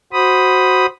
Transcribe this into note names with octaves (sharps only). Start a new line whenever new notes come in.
F#4 C5 B5 D#6